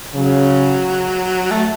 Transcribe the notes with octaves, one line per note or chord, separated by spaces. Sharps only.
C#3 F#3
A3